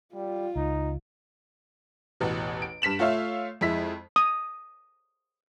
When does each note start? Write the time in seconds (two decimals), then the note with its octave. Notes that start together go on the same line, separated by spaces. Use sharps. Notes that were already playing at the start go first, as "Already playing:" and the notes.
0.15 G3 F4
0.56 C#2 D#4
2.20 A1 E2 B2
2.62 D7
2.82 G2 B6 E7 F#7
2.99 A3 F4 C#5 E5 F5
3.61 F2 G#3 E4 B6
4.16 D#6